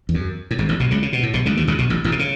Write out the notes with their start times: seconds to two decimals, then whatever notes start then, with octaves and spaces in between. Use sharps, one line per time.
0.09 E2
0.14 F#2
0.51 A2
0.59 G#1 G#2
0.69 A1 A2
0.80 B1 B2
0.91 C#2 C#3
1.02 C#3
1.13 B2
1.23 A2
1.34 B1 B2
1.46 C#2 C#3
1.57 D#2 D#3
1.68 C#2 C#3
1.79 B1 B2
1.90 A1 A2
2.04 A1 A2
2.12 B2
2.19 C#3